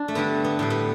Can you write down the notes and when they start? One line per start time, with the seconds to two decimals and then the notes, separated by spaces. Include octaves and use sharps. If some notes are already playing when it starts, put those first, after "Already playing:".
Already playing: D4
0.08 A3
0.15 G2 D3 G3 B3
0.44 B3
0.59 A2 G3 B3
0.70 B3